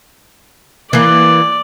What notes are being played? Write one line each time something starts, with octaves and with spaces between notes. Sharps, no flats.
E3 A#3 D5